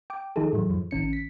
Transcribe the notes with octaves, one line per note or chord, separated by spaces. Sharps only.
G5 D6
D#3 F3 D#4 G#4 A4
A2 E3 F#3
F#2 F3
A1 D#3 C#4 C#7
B6